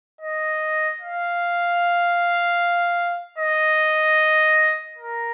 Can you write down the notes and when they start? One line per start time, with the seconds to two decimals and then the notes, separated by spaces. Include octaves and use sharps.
0.21 D#5
1.00 F5
3.39 D#5
4.98 A#4